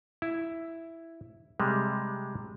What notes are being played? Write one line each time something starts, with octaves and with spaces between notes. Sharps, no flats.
E4
C3 G3 G#3